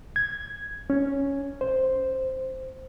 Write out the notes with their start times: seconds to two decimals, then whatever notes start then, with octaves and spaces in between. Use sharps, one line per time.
0.16 G#6
0.90 C#4
1.61 C5